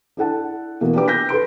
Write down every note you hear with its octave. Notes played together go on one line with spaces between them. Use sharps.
D4 E4 A4 F#5 A5
B2 E3 A#3 A4
D4 F4 G4 B4 G5 D6
G6 A#6 B6
A4 B4 C6 D7